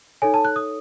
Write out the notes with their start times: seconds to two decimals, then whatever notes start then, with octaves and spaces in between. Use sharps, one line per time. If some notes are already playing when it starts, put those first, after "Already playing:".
0.22 D#4 A4 C#5 G#5
0.34 A5
0.45 F#6
0.56 D#6